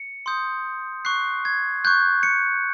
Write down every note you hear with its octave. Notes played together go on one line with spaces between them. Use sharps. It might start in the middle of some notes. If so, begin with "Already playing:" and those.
Already playing: C#7
C6 D#6 G6
C#6 F#6 C7
G#6
C#6 F#6 G6
C#7